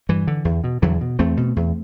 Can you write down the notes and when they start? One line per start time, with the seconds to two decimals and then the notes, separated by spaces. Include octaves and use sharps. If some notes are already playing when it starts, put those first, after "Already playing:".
0.09 G2 E3
0.27 D3
0.45 E2
0.64 B2
0.82 E2 D3 F#3
1.01 B2
1.19 E2 A3 C4
1.37 B2
1.56 E2